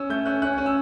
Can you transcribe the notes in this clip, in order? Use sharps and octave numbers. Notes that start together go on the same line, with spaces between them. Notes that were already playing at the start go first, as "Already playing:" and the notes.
Already playing: C#4 E6
A3 G6
C#4 F#6
C#4 F#6
C#4
E6